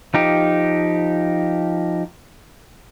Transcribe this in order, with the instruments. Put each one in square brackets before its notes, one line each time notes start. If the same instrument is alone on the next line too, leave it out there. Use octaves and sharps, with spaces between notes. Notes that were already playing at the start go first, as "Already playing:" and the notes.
[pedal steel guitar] F3 D#4 G4